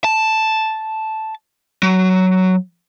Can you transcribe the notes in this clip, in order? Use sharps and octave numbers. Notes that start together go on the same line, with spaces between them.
A5
F#3